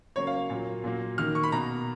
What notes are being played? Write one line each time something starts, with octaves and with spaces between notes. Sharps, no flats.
C#3 F#3 A#3 C#5
F5
A#2 F#3 A#3
A#2 F#3 A#3
D#3 A#3 F6
C#6
B5
B2 A#3 A#5